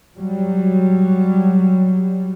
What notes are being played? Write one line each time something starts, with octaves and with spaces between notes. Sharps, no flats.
F#3 G3